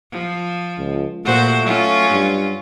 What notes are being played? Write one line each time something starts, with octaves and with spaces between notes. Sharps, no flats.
F3
C#2
A#2 A3 F#4 C5
F#3 C#4 F4
G2